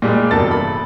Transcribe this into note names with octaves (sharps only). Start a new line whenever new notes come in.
A#2 G3 G#3
E1 G2 C3 A4 A#4 A6
B5